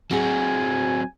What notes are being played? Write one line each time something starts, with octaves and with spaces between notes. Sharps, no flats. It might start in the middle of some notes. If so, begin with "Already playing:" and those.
F#3 C4 F#4 G#4 G#5